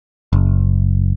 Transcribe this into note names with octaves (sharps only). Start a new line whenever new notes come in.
F#1